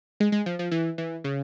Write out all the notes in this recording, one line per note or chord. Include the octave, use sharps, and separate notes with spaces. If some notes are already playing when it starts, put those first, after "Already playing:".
G#3
G#3
F3
F3
E3
E3
C#3